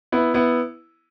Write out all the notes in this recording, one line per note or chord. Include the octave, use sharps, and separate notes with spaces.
B3 E4
B3 E4